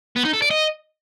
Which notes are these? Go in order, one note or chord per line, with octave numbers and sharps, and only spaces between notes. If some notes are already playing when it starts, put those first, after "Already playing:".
B3
D#4
A4
D5
D#5